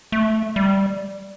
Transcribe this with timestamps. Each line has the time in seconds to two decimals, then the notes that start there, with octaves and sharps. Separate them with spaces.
0.12 A3
0.56 G3